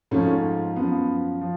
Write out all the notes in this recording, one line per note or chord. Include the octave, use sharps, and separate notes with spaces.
G#2 F3 A3 C#4
F#2 F3 B3
F3